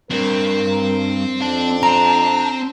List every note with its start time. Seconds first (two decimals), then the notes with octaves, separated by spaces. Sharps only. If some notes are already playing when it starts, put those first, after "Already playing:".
0.11 C#2 G2 C4 A#4
1.41 F2 D4
1.83 C4 A#5